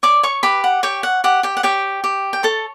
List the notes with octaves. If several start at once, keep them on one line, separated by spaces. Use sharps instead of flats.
C#5 D5 D6
C#5 C#6
G4 B4 B5
F#5
G4 C#5 G5
F#5
G4 F#5
G4 G5
F#5
G4 C#5 G5
G4
G5
A4 C#5 A5